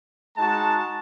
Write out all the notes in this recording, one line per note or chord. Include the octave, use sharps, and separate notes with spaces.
G#3 D#4 F#4 A5